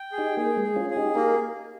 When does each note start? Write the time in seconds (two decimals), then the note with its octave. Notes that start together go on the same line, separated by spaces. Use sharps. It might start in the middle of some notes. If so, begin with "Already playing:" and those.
Already playing: G5
0.12 G#4
0.18 D#4 G4
0.37 A#3 G#4
0.57 G#3
0.63 G#4
0.76 C#4 F4
0.90 G#4
0.96 D#4 G4
1.15 A#3 G4 A#4